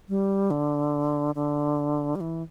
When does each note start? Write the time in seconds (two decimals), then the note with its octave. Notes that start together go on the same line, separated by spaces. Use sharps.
0.09 G3
0.51 D3
1.35 D3
2.16 G3
2.21 E3